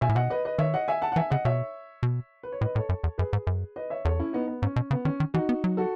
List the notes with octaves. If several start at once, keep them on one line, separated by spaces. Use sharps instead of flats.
B2 E5 G#5
A2
B2 D#5 F#5
B4 D#5
B4 D#5
D#3 C#5 E5
D#5 F#5
E5 G#5
F#5 A5
F#5
E3 E5 G#5
C#3 D#5 F#5
B2 C#5 E5
B2
B4
C#5
A2 B4 D#5
A2 A4 C#5
F#2
E2
F#2 G#4 B4
G#2
F#2
B4 D#5
C#5 E5
E2 A4 C#5
C#4 E4
B3 D#4
B3
G#2 C#4
B2
C#3 B3
D#3 C#4
D#3
E3 D#4 F#4
B3
F#3
F#4 A4